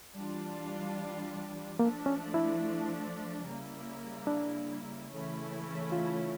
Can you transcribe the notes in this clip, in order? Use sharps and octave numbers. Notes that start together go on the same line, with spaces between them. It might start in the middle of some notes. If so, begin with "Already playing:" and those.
E3 G3 D4 F4
F3 A3 A#3 D4
C#4
E4
C#3 G3 A#3 E4
D4
C#3 E3 A3 C#4 E4
F4